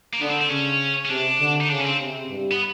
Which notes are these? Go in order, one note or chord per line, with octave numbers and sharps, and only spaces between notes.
A#3
D3 B3
C4
C4
C#3 C#4
C#4
C3 D4
D3
D#4
C#3 D4
C#4
C4
C3
G2
B3